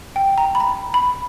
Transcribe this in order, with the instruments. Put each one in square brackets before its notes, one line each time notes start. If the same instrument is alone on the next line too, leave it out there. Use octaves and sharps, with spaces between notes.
[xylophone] G5
A#5
B5
A#5
B5